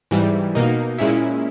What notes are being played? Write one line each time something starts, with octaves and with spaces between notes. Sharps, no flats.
G#2 E3 G3
B2 A#3 D#4
A#2 G#3 C#4 E4